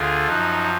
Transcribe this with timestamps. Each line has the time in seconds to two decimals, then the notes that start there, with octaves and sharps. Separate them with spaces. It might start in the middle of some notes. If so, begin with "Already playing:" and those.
Already playing: D2 D3 F4 G#4
0.26 F#2 F3 D#4 F#4